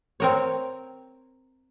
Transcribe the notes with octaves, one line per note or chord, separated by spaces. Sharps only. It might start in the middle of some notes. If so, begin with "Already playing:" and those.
C4 A#4 C#5